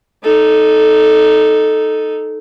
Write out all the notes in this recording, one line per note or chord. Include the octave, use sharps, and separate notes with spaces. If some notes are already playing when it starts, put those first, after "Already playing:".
D#4 A4